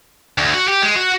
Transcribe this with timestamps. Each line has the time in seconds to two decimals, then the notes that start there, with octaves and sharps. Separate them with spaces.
0.38 D2
0.54 F#4
0.68 G4
0.82 G#3
0.96 F#4